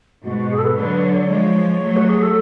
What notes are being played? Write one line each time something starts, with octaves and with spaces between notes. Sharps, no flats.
G#2 B2 F#4
F#4
G#4
A4
B4
D3 F#3 B4
C#5
D5
F3 G#3 C#5
F#3 A3
F#4
G#4
A4